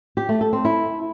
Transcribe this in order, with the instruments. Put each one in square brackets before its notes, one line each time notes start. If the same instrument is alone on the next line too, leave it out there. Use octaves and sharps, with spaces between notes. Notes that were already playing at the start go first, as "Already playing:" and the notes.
[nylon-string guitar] G4
A3
A4
C4
E4